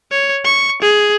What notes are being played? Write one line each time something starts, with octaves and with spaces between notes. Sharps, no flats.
C#5
C#6
G#4